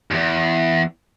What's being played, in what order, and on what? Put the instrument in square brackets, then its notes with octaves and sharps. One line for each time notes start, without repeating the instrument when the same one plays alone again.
[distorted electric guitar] E2 G#2